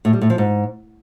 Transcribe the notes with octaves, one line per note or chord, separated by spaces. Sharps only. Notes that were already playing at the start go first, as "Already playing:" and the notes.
A2
G3
A2
F3
G#2